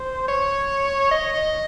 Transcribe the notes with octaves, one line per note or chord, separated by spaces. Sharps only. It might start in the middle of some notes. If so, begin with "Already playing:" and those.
Already playing: C5
C#5
D#5